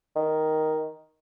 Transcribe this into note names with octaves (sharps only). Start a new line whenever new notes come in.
D#3